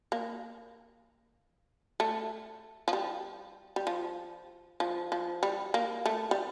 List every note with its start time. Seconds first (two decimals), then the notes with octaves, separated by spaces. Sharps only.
0.12 A#3
2.00 A3
2.88 F3
2.93 G3
3.76 G3
3.87 F3
4.80 F3
5.12 F3
5.43 G3
5.74 A#3
6.06 A3
6.31 G3